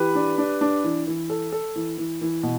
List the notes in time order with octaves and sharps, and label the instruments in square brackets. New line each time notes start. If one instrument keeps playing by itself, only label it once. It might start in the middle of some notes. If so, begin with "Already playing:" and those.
Already playing: [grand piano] E3 [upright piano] G4 B4
[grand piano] D4
D4
D4
E3
E3
A4
A4
E3
E3
E3
B2